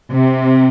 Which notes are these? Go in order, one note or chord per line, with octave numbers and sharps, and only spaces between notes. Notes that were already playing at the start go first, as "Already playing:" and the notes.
C3